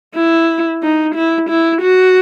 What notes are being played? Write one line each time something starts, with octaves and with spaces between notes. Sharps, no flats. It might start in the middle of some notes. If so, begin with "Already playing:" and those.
E4
D#4
E4
E4
F#4